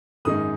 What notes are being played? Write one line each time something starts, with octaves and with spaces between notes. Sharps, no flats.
G#1 F#2 D#3 G#3 D#4 D#6